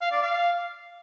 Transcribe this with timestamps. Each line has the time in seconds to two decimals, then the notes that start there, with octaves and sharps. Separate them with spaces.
0.01 F5
0.11 D5
0.21 F5